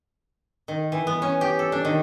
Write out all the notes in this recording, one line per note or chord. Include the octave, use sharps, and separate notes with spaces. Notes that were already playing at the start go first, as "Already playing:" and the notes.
D#3
E3
B3
C#4
G4
A4
D4
D#3